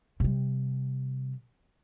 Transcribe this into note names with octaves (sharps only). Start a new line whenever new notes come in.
C3 G3